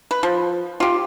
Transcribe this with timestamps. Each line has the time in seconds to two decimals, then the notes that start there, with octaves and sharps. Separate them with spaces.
0.11 B4
0.23 F3
0.80 F4 G4